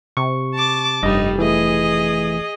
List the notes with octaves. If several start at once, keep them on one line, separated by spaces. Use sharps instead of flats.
C3 C#6
A5 D6
F1 G2 G3 D#4 D#5
E3 A3 G#4 D#5